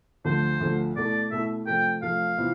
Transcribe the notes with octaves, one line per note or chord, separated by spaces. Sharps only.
D2 D3 F3 A3 C5
D2 D3 F3 A3
B2 A3 E4 D5
B2 A3 E4 E5
C3 F3 A3 G5
C3 F3 A3 F5
C3 E3 B3 F4